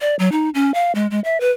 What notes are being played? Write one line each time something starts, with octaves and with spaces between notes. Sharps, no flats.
D5
F#3
D#4
C#4
F5
G#3
G#3
E5
B4